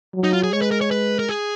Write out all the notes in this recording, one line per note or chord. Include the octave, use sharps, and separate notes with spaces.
F#3
D#4
F4
G#4
G#3 C#5
B4
A#4
C#5
B4
A#4
G#4